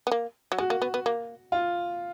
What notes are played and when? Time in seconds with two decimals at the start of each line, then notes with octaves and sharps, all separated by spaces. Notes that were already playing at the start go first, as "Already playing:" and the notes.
0.07 B3
0.12 A#3
0.52 F#3
0.58 G#3 F#4
0.70 A#3
0.82 B3
0.94 B3
1.06 A#3
1.52 F4